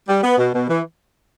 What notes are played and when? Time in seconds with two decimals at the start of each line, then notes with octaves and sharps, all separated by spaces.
0.08 G3
0.23 B3
0.38 B2
0.54 B2
0.69 E3